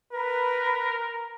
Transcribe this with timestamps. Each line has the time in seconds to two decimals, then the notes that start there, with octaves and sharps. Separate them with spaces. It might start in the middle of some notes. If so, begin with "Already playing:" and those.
0.12 A#4 B4